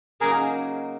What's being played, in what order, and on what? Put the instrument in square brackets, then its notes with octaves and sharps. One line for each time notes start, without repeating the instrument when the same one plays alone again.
[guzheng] C#3 F#3 A#3 D#4 F#4 [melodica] G#4 A#4